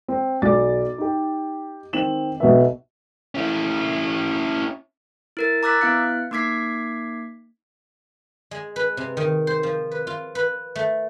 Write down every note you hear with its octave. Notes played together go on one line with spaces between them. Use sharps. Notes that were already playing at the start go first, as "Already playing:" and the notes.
C4
B1 D5 D6 A6
D#4 G4
D#3 C4 E7 F#7
B1 B2 B3 E5
C#4 E4
E4 A#4 A6
A#5 D6 E6 F#6 A6 B6
B3 E4 F5 F#6 C#7
A#3 D#4 D6 G#6 B6 C7
G#3
B4
C3
D#3
C5
F3
B4
F4
B4
A3